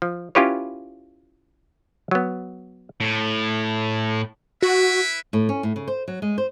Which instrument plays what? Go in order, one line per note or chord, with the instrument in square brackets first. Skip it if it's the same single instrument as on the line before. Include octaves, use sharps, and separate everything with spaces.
[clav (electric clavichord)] F3
C#4 E4 F4 G4 B4 C#5
F#3 B3
[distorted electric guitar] A2
[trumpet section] E4 B4 E5 [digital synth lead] F#4
[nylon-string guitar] A2
C#4
A2
C#3
C5
F#3
G#3
C5